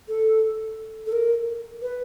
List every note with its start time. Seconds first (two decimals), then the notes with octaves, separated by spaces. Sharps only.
0.08 A4
1.06 A4
1.12 A#4
1.82 B4